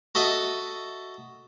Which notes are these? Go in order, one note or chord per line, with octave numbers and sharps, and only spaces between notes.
F#4 A4 D#5 E5